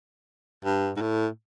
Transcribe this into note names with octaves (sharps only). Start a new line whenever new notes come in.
G2
G#2
A2